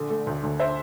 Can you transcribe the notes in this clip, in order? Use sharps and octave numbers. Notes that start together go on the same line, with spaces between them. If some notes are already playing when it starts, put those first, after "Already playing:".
Already playing: A#1 D3
A3
D2
D2
C5 E5